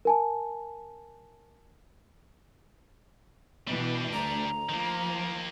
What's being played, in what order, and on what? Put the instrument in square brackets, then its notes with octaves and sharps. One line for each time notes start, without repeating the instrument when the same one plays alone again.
[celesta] A#4 G#5 A5
[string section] B2 E3 [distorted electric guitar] G3 D4
[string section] D2 [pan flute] A#5
[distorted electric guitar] D#3 A#3 [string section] F3